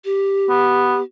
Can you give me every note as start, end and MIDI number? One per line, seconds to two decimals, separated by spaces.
0.05 1.02 67
0.50 1.00 59